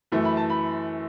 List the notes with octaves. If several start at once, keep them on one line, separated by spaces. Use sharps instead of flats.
F#2 E3 A3
B5
A5
B5